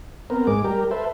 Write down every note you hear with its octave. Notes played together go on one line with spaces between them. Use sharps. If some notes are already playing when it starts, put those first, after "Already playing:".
B3 C4 A#4
G#2 G#3 D6
G3 G4 A#4
A4 B4 C5 E5